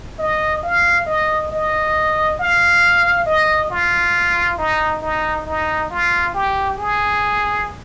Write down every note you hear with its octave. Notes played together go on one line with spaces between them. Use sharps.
D#5
F5
D#5
D#5
F5
D#5
F4
D#4
D#4
D#4
F4
G4
G#4